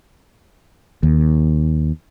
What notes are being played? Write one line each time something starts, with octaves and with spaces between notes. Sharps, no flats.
D#2